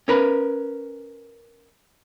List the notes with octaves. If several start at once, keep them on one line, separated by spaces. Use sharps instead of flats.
C#4 A#4 B4